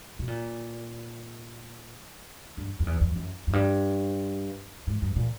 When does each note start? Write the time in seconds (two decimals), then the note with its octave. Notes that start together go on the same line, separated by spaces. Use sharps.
0.19 B2
0.28 A#2
2.57 G2
2.80 F2
2.87 E2
3.01 F2
3.15 F#2
3.47 F#2
3.53 G2
4.87 G#2
5.02 G2
5.16 A#2